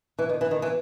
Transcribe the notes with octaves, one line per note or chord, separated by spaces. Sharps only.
E3
D#3
E3
D#3
E3